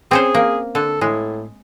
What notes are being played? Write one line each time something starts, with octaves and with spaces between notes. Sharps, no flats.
C4 C#4 G#4 C5
A#3
D3 A4
A2 G#3